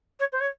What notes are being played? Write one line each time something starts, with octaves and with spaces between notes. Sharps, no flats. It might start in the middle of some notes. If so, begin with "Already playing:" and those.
C#5
C5
C#5